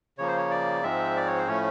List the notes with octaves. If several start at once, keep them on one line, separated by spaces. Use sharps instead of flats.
C#3 F3 A#3 C#5
C5
C#5
D5
G#2 F3 G#3 C4 E5
D5
C#5
C5
A2 F3 A3 C#4 C#5